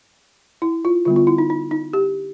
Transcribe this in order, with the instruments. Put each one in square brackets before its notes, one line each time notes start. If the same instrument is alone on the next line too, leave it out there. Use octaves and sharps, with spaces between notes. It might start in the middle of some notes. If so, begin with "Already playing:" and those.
[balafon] E4
F4
D3 G3 B3 F4
F4
E4
D#4
D#4
D#4
G4